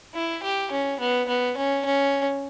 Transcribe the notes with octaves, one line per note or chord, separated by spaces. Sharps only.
E4
G4
C#4
B3
B3
C#4
C#4